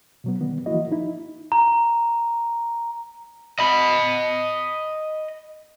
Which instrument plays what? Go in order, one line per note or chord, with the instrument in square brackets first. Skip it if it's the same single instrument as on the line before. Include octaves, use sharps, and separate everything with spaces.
[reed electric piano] B2 F#3 B3
D#3 G3 B3
E3 F3 A#3 E4 F#4 D#5
D#4 E4
[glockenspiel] A#5
[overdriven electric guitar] D#5 B5